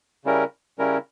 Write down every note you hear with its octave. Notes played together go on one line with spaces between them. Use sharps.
C#3 G3 C#4 E4 A#4
C#3 G3 C#4 E4 A#4